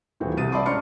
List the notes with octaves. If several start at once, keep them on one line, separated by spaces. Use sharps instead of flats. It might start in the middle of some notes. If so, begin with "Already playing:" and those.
D#1 A#2 E3 C4 F#4
C2 C3 D#6 A6 D#7
D5 E5 A5 B5 C6 D6
G#2 C#4 D#4 C6 F6 C#7